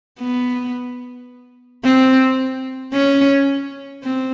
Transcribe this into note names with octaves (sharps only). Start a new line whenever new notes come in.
B3
C4
C#4
C4